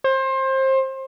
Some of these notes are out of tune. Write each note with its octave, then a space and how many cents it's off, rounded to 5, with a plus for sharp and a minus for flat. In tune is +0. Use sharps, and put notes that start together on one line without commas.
C5 +25